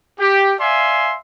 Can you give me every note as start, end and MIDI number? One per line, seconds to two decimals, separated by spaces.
0.20 0.54 67
0.60 1.16 74
0.60 1.16 76
0.60 1.16 77
0.60 1.16 80
0.60 1.16 84